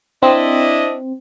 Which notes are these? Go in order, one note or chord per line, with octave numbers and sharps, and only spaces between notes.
C4 D4 E4 D#5